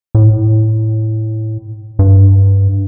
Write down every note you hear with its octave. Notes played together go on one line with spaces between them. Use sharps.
A2
G2